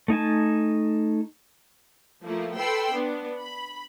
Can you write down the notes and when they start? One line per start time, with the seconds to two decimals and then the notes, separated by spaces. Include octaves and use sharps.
0.08 A3 D#4 G#5 A5
2.24 F3 A3 A#3 E4
2.57 A4 B4 G5 B5 C6 E6
2.92 B3 D4
3.40 B5